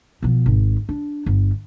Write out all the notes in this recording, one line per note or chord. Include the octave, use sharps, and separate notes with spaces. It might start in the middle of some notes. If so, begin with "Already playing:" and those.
B2 F3
G#1
D4
G1